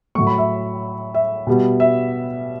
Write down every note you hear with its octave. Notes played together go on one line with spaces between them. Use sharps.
A2 F#3 A3 C#6
B5
E5
E5
B2 G3 B3
E5